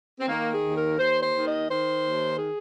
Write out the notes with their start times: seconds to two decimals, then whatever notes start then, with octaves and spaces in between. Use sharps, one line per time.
0.19 C4
0.28 D#3 A#3
0.51 G#4
0.63 D#2
0.75 A#4
0.98 D#2 C5
1.22 C5
1.33 D#3
1.45 D#5
1.68 D#3 C5
2.03 D#2
2.38 G#4